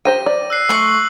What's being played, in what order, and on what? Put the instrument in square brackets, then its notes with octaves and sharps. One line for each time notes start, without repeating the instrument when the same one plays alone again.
[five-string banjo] G4 C5 G5 [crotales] A#6 D#7
[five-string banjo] D5
[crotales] E6 F#6 C7
[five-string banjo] A3 [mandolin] C6 C#6 [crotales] E6 F#7